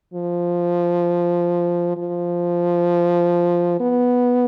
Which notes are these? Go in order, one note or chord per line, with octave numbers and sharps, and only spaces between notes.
F3
F3
B3